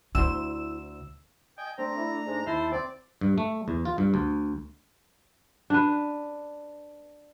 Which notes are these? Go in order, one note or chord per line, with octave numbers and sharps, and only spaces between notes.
D2 E4 C5 E6 E7
D#5 G5 G#5
A3 C4 D4 A#5
E4
G#2
D#2 E4 C5 A5
C4 D5
G2
A3
E2
F4
G2
D2
D4 B4